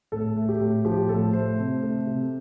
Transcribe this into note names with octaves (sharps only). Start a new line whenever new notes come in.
A2 A4
A3
G4
A2
F3 G4
A2 A4
A3 C5
C3
A3
C3